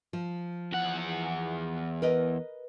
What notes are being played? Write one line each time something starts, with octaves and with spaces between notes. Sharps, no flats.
F3
E2 F#5
A#4 B4 D#5